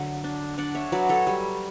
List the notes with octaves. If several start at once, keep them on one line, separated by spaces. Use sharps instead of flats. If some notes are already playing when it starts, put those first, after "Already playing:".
Already playing: D3 F#3 E5
D4
D4 D5 F#5
C#5 E5
F#3 B4 D5
A4 C#5
G3